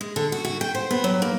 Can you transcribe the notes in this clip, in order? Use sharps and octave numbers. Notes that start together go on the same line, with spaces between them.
G#3
D3
F#4
F#4
G5
C5
B3
F#3
A#3